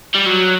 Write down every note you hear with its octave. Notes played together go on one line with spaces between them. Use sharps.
G3
F#3